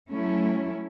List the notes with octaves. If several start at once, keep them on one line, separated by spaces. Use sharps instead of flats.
F#3 A3 C#4 E4